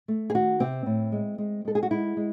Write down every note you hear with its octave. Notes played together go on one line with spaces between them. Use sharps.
A3
G#4
D#3 F#4
C3 C4
A2
G#3
G#3
G#3 A4
G#4
F#4
G#3 E4
G#3